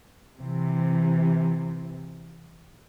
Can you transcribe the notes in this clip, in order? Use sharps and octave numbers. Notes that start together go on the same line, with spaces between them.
C3 E3